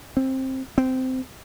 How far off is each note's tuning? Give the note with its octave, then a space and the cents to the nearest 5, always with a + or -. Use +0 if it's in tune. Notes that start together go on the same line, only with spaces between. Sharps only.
C4 +15
C4 -15